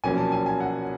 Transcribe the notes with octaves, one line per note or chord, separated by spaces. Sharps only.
B1 A#2 F3 A#3 C#4 G#5
A5
G#5
G#5
F#5